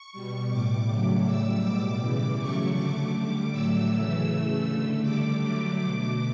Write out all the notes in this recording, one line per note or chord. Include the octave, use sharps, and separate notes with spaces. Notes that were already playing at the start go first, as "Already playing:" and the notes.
Already playing: C#6
B2 G3
A2 G3 D6
C#3 F#3 A3 D6
A2 G3 E6
B2 G3 D6
C#3 E3 G3
C#3 F#3 A3 C#6
D3 A3 D6
D3 G3
A2 F#3 A3 E6
C#3 E3 A3 E6
C#3 E3 A3
D3 A3
D3 G3 D6
D3 F#3 A3
B2 A3